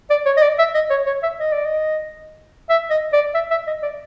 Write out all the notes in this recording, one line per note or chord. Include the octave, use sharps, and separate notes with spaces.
D5
C#5
D#5
D5
E5
D#5
C#5
C#5
E5
D#5
D5
D#5
E5
D#5
D5
E5
E5
D#5
D5